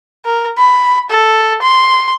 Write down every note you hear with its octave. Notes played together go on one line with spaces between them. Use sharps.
A#4
B5
A4
C6